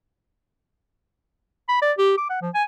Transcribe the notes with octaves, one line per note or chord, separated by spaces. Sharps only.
B5
D5
G4
D6
F#5
F3
G#5